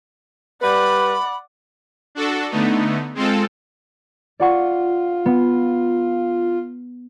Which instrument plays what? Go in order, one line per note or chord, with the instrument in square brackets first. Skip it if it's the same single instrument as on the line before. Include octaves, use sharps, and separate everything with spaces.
[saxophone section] G3 B4 [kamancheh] D5 F#5 [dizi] B5
[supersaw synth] D4 F#4 A4
D3 A3 B3 D#4
G#3 C4 F4 A4
[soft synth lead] F4 [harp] D5 F#5 C#6
[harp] B3